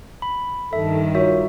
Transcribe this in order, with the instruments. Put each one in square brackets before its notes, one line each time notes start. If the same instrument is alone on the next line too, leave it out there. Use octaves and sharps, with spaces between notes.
[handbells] B5
[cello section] G2 D#3 [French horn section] A4 [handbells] E5
[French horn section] F4 A#4 C#5 [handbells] F#4 E5